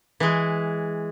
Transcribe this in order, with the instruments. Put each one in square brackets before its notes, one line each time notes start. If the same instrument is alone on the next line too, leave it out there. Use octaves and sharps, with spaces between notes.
[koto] E3 G#3